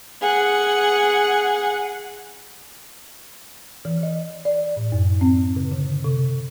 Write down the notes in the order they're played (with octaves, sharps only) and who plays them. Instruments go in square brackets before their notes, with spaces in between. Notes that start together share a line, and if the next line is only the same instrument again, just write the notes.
[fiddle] G#4 F#5
[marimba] E3
D#5
D5
A2
F#2
C4
C#3
D3
C3